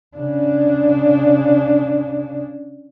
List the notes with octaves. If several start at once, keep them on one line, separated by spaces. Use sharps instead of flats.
C#3 D4